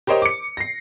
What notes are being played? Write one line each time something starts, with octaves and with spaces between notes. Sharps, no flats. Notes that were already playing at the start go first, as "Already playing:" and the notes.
G4 A#4 C5 C#5 D#5
D6 C#7
A#6 C7